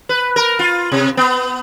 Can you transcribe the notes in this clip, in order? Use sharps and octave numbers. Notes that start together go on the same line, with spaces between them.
B4
A#4
F4
C3
B3